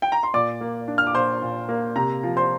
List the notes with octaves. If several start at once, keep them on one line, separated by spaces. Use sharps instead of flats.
G5
A#5
C6
A#2 D5 D6
A#3
D4
F6
D6
A#2 C5 C6
A#2
A#3
C3 A#5
F3
C5 C6